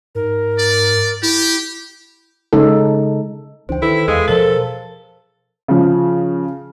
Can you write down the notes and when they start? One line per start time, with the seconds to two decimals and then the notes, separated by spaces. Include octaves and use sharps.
0.15 G#2 A#4
0.58 D5
1.23 E4 G4
2.53 C#3 G#3 D#4 A4
3.69 C#2 E3 D4 C5 G5
3.82 D#3 E4 A4 B4
4.08 E2 G#3 G#4 A4 F5
4.28 B2 F3 A4 A#4 C5 A5
5.68 C#3 F3